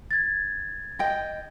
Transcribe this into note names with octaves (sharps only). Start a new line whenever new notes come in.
G#6 A6
D#5 G5